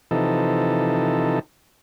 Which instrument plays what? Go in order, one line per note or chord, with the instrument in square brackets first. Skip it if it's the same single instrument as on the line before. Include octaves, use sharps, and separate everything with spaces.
[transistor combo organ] C3 E3 F3 D#4 A4